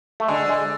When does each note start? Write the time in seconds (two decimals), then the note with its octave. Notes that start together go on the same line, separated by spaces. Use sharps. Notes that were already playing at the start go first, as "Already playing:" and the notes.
0.20 A3
0.28 D3 G#3
0.49 G#3